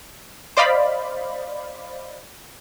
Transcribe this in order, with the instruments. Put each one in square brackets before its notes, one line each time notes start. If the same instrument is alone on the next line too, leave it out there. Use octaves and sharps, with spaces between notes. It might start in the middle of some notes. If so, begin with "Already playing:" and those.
[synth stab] C5 D5 D#5 F5 B5